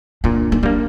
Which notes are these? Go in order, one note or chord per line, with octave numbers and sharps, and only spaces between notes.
A#2 D4
D#4
G3 A#3 D4